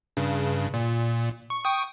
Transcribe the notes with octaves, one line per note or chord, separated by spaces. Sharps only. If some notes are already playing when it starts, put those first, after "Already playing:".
G2 C#3
A#2
C#6
G5 C#6 D#6